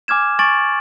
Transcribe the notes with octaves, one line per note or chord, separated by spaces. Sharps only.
G#5 D6 F6 G#6 E7
G#5 C#6 D6 A6 D7 F#7